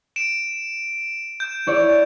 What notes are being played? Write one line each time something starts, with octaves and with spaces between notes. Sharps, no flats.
D7 E7
G6
E4 C#5 D5